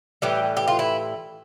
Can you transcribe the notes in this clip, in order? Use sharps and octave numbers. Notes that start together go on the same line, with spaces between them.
A2 E3 G3 G4
G4
F4
E4